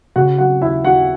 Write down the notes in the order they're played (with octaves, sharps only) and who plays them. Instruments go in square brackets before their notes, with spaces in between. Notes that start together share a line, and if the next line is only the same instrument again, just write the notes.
[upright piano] C#3 F#4 F#5
F#3 F#4 F#5
D#2 E4 E5
D#2 F#4 F#5